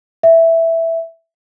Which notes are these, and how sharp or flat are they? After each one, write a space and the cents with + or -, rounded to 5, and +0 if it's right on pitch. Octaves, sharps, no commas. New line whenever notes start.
E5 +0